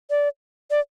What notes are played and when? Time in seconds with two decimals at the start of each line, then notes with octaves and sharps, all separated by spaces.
0.10 D5
0.71 D5